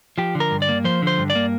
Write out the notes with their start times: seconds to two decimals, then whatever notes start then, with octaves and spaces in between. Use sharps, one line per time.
0.18 F3 G4
0.35 D3
0.40 A#4
0.51 G2
0.62 D5
0.69 A#3
0.84 F3 C5
1.02 D3 C5
1.18 G2
1.30 D5
1.35 A#3